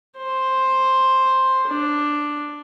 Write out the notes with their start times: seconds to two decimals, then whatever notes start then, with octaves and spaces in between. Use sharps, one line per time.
0.17 C5
1.67 D4